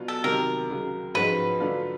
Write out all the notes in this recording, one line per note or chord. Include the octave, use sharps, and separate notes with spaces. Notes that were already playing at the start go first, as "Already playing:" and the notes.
Already playing: B2 F#3 B3 D4 F4
A4
C3 D#3 F#3 A#4
C#2 C#3 F#3
G#2 F3 G#3 C#4 F#4 B4
D3 F#3 A3 D4 F4